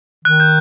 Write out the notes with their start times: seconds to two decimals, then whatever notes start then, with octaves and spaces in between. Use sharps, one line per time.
0.25 D#3 F#6
0.40 G6